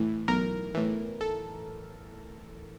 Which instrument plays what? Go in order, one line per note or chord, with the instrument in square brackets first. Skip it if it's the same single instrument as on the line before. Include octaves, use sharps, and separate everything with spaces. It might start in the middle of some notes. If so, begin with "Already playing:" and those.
Already playing: [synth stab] A2 E3
B1 A#4
A2 E3
A4